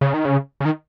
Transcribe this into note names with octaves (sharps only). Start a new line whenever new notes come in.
C#3
D#3
C#3
C#3
D#3